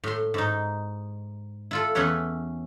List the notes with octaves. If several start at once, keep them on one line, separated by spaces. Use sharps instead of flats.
A2 C6
G#2 D#4
E4 F4 A4
E2 C#4 E4 B4 C#5